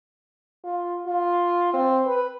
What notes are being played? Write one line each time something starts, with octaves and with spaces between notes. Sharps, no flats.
F4
F4
C4
B4